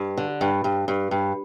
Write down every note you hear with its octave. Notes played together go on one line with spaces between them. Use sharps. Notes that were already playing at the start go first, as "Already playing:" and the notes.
Already playing: G2
D3
G2
G2
G2
G2